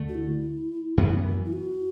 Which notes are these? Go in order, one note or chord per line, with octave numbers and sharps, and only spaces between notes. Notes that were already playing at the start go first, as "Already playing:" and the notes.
Already playing: D2 D3 A3
F#4
E4
F#2 E3 B3
E4
F#4